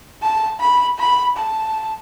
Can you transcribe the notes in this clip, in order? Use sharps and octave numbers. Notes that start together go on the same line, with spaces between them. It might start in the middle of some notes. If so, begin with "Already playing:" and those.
A5
B5
B5
A5